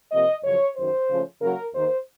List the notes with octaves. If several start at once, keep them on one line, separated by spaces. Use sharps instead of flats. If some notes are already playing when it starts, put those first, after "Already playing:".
C3 F3 A#3 D#5
F#2 C#3 F3 C#5
F#2 D#3 F#3 C5
C#3 F3 A3 C#4
C#3 F#3 A#3 A#4
D#2 D#3 A#3 C5